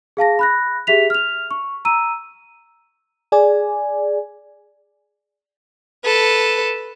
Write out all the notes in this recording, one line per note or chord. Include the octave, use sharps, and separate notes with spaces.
G#4 F5 A5 A#6
B5 F#6 A#6
G4 G#4 E5 B6 F7
F6 F7
C#6
A#5 E6 D#7
G#4 D5 G#5
A4 B4